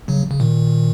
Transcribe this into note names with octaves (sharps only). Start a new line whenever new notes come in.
C#3 F#3
C#3
A#2 D#3